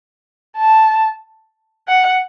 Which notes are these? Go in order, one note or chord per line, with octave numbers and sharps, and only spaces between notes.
A5
F#5